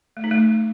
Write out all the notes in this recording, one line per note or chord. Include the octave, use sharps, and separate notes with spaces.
A3
D#4
A3